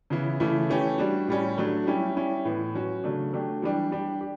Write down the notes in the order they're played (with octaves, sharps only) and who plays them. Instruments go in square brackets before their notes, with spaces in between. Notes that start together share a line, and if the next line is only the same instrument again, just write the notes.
[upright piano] C#3 E3 B3 E4
C#3 E3 A3 E4
E3 A3 C#4 G4
G3 D4 F#4
A2 G3 C#4
F#3 A3 D4
G3 C#4 E4 G4
G3 C#4 E4 G4
A2 E3 B3
F#3 C#4 F#4
C#3 F#3 A3 D4
F#3 A3 D4 G4
E3 G3 D4 G4
G3 D4 G4
G4